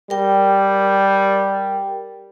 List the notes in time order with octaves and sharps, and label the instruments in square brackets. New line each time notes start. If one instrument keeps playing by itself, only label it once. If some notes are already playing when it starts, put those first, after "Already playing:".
[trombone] G3 [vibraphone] A#4 G5